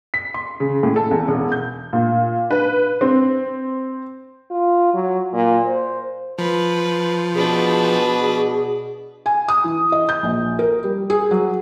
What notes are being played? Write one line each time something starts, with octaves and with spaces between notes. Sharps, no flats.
B6
C6
C#3
A2
A4
E2
E1
G6
A#2
B4
C4
F4
F#3
A#2
C5
F3 B4
B2 D4 G#4 B4
G#5
D#6
E3
D#5
G6
A#1
A#4
G3
G#4
F#3